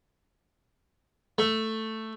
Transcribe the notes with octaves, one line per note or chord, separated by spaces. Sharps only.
A3